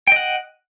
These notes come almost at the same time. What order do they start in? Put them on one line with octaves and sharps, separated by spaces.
G5 D#5 F#5